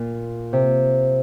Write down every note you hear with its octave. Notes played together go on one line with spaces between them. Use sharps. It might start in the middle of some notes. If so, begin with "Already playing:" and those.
Already playing: A#2
C3